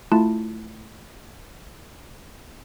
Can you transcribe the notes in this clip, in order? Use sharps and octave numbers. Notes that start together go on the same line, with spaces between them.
A3 E4 F4 A5